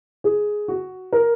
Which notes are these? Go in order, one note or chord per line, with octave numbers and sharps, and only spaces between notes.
G#4
F#4
A#4